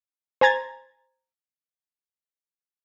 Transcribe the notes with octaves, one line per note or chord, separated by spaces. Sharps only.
C5 G#5 A#5 G#6 A6